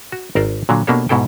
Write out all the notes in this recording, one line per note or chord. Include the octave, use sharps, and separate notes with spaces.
F#4
G#1 A#4 C5 D5
A#2 D3 F#3
B2 A#3 D4 G4 A4 C#5
G#2 B2 E4 A4 G5